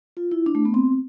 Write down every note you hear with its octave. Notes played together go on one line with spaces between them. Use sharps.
F4
E4
D4
A3
B3
C4